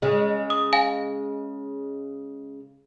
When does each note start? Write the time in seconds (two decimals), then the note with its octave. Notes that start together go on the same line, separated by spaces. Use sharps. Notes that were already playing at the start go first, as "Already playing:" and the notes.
0.02 C#3 G#3
0.50 D#6
0.73 F5 G#5